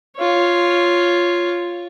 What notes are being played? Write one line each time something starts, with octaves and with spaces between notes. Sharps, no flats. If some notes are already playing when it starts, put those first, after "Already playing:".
F4 C#5